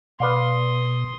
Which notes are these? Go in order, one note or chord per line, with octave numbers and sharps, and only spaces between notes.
B2 B4 D5 F5 C6 D#6